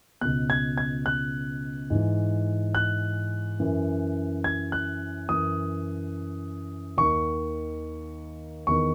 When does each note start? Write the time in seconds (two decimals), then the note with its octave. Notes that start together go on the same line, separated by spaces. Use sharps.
0.21 C#2 B2 F#6
0.50 G#6
0.78 G#6
1.06 F#6
1.90 G#2 E3
2.75 F#6
3.60 F#2 E3
4.44 G#6
4.72 F#6
5.29 F#2 E3 D#6
6.98 D#2 D#3 C#6
8.67 E2 D#3 C#6